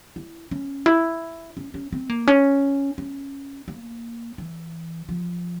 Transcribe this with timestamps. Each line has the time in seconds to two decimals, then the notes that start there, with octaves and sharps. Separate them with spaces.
0.16 E4
0.51 C#4
0.86 E4
1.57 C#4
1.74 C#4
1.92 C4
2.09 A#3
2.27 C#4
2.98 C#4
3.68 A#3
4.38 E3
5.09 F3